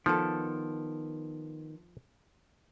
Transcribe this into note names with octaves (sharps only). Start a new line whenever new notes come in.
D#3 F3 B3 A4